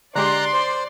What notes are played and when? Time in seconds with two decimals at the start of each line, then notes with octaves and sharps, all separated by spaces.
0.16 D3 G#3 G4 D5 A#5 C6 F#6
0.53 C5